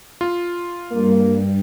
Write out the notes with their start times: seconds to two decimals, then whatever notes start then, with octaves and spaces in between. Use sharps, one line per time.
0.21 F4
0.91 G2 A#3